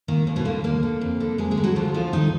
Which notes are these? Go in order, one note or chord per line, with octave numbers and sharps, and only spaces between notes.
D#3 A#3
D#2 A#3
B2 B3
D3 A#3
D#2 A#3
D3
F2
D3
F2 G#3 G#4
G#3 G#4
D3
F#3 F#4
D2 F3 F4
D3 F3 F4
D2 D#3 D#4